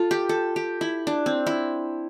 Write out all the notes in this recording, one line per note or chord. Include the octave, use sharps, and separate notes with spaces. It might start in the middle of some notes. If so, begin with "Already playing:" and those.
Already playing: F4 A4
G4
A4
G4
E4
D4
C4
E4